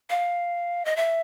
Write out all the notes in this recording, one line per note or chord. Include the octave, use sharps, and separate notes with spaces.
F5
D#5
E5